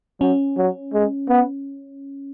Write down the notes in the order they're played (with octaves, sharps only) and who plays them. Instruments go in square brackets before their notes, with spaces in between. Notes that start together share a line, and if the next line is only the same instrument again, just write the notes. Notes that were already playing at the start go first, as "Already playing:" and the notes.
[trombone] F#3 [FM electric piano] C#4
[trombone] F#3
G#3
B3